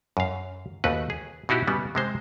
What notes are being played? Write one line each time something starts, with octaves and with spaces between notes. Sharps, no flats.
F#2 F5
D#2 A3 F#4 B4
G#4
B2 D#4 E4 F#4 G4
C#3 G3 B3
C3 G#3 C5